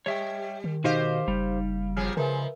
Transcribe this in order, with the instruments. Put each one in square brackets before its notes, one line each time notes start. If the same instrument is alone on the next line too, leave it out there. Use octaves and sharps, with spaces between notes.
[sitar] G3 [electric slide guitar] C#5 E5 G5
[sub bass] D#3
[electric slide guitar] B2 F#4 D#5 [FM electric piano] D#4 F5 [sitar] G4 C5
[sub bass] F#1 [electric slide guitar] G3
[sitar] C3 F3 G#4 [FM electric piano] F6
[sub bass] C#3 [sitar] F3 G#3 [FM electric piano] A#4 B4 E5